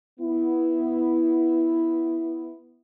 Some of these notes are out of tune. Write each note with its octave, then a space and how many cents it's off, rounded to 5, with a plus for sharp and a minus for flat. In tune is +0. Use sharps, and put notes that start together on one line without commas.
B3 +0 E4 +0